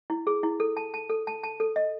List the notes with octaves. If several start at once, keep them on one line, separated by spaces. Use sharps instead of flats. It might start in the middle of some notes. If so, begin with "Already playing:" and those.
E4
G#4
E4
A4
A5
A5
A4
A5
A5
A4
D#5